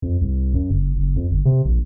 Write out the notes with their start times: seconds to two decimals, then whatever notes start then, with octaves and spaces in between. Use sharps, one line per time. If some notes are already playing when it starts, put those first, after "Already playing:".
0.02 F2
0.21 C2
0.54 F#2
0.71 F#1
0.96 F#1
1.16 F2
1.31 G1
1.45 C3
1.65 A#1